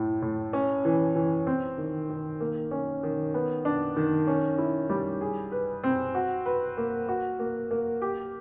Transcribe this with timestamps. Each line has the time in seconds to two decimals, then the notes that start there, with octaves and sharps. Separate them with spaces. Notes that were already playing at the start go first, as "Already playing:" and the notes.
Already playing: A2 A3
0.22 A2
0.53 C#4
0.85 E3
1.15 E3
1.47 C4
1.78 D#3
2.09 D#3
2.40 A#3
2.71 C#4
3.03 D#3
3.34 B3
3.65 D4
3.96 D#3
4.27 C#4
4.58 E4
4.90 G3
5.21 G#4
5.52 B4
5.83 C4
6.15 F#4
6.46 B4
6.77 A#3
7.08 F#4
7.39 A#3
7.71 A#3
8.02 G4